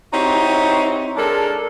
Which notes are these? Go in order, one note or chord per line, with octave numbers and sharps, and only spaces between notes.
C4 D#4 E4 F#4 G4 C#5
G#3 D4 A4 A#4